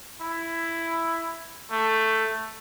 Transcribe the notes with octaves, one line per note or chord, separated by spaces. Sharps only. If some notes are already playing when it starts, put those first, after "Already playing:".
E4
A3